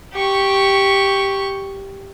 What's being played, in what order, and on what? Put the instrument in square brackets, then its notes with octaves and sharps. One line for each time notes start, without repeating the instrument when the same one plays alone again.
[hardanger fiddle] G4 C#6